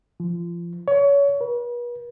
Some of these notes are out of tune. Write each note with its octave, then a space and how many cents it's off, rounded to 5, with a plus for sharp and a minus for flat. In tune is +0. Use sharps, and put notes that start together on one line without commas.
F3 -25
C#5 +30
B4 -40